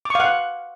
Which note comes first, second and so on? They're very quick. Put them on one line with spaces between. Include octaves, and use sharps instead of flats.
D6 C#6 F5 F#5